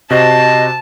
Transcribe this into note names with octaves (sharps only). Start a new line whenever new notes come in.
C3 F#4 C5 D#5 A5